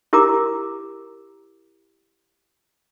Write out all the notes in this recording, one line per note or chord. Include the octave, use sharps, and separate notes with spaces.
E4 G4 A#4 A#5 D6